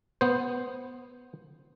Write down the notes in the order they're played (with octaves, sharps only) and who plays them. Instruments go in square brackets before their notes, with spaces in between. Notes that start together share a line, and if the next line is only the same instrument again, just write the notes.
[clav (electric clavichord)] B3 C5